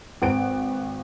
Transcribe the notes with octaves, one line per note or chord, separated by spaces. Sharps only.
G#1 B4 D7